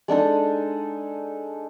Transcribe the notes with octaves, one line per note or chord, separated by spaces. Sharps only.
G#3 D4 D#4 A4